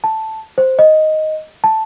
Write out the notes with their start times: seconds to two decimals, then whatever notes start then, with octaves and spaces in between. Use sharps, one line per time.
0.04 A5
0.58 C5
0.79 D#5
1.64 A5